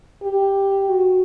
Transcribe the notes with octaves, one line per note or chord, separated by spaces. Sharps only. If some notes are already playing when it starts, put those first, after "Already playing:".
G4
F#4